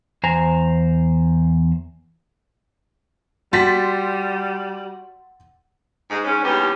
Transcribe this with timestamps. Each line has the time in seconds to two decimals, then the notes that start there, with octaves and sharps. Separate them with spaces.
0.23 E2 C5 G#5 A#5
3.53 G3 F#4 C6 A6 B6
6.10 G#2 G#3
6.24 G#2 C#4
6.44 D#2 E3 G3 B3 C#4 G4